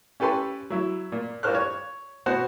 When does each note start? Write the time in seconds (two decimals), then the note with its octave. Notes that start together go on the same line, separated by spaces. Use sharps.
0.20 C#4 G4 A4 B4 C6
0.70 F#3 E4
1.12 A#2
1.43 G2 F4 A#4 C5 F6 F#6
1.55 C#5
2.26 B2 B3 F#4 C5 F#5